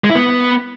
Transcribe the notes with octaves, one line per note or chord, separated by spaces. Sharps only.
G#3
E4
B3